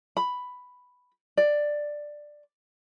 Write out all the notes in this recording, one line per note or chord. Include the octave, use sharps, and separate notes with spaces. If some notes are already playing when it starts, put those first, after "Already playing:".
B5
D5